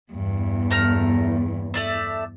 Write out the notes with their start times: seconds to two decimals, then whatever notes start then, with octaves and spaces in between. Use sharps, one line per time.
0.13 E2 G2
0.71 A3 A#5 F6
1.74 A3 D5 E5